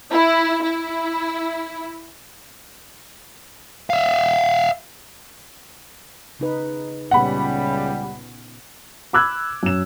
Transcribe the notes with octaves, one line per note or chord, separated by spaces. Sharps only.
E4
E4
E5 F5
C#3 D#4 B4
C#2 A#2 C#3 G3 B3 C#4 F#5 B5
B5 D6 E6 F#6 G#6
F#2 E7